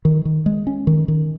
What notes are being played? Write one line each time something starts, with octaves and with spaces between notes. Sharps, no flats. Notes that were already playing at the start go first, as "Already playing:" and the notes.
D#3
D#3
G#3
C#4
D#3
D#3